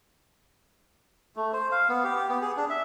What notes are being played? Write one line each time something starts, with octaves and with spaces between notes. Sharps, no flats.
A3
C5
F5
B3
G4
G4
B3
G#4
D4
E5